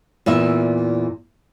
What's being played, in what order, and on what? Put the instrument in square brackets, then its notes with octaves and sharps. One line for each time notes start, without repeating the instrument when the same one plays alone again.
[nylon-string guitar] E2 A#2 E4 E5